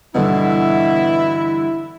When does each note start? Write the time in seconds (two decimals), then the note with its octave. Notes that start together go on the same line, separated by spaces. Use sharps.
0.15 G2 B2 D3 E3 E4